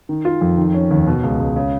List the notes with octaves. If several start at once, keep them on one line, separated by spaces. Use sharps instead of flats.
D#3
F4
F2
D#3
C#4
D#2
B2
C#2
C#2
C#3